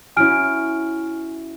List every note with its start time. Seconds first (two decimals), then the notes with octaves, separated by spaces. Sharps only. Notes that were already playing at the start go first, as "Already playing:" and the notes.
0.17 C#4 E4 F#4 G#5 F6 D7